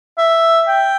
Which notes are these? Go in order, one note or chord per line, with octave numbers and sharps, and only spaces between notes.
E5
G5